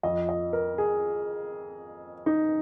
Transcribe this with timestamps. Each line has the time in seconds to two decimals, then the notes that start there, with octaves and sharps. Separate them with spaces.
0.03 F2 F3 D#5
0.29 D#5
0.53 A#4
0.78 G#4
2.26 D#4